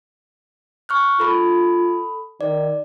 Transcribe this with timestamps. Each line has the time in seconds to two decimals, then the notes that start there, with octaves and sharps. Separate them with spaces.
0.89 C#6 F6 F#6
1.20 F4 A4 B5
2.41 D#3 D5